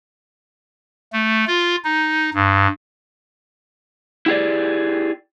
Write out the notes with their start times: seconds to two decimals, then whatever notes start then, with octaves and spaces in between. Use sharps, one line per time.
1.13 A3
1.47 F4
1.84 D#4
2.34 G2
4.26 E4 G4 G#4 D5